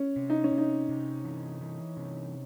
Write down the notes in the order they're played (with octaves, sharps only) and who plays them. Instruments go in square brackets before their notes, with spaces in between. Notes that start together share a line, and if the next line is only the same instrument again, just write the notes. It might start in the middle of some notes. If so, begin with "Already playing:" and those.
Already playing: [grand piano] C#4
[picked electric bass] C3
[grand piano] D#4
C#4
[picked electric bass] C3
[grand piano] D#4
[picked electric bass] C3
E3
E3
C3